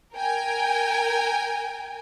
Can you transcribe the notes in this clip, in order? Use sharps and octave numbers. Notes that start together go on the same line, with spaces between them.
A#4 G5 G#5